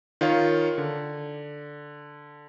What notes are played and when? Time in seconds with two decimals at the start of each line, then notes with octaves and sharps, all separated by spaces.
0.21 D#3 F4 C#5 F5
0.78 D3